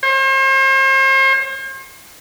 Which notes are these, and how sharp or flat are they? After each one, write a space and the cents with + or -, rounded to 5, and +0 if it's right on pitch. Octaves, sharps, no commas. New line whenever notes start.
C5 +40